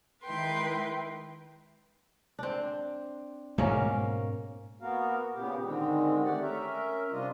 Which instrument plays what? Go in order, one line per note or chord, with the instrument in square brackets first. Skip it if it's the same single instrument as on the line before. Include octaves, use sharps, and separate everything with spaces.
[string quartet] D#3 G#3 E4 B4 G5 C6
[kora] C4 D4
[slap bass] G#2 B2 G#3 [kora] A#3 C#4
[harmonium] A#3 B3 F#4 A#4 F5
A#2 C#3 B3 G4
G#2 D3 D#3 G#3 C4
A3 G4 D5 F#5
C#4 A#4 E5
C3 G3 D4 F4 D#5